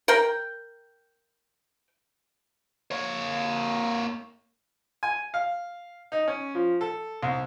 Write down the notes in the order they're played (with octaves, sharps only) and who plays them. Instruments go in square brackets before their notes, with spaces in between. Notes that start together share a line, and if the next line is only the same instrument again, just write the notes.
[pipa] A#4 G5
[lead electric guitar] A#3 C#5
[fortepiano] G#5
F5
D#4
C#4
F3
A4
C2